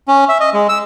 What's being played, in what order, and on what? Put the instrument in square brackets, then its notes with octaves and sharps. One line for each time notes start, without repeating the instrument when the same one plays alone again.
[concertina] C#4
E5
D#5
G#3
E6